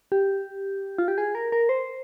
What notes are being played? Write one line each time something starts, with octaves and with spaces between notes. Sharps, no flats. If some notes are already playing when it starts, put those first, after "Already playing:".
G4
F4
G4
G#4
A#4
A#4
C5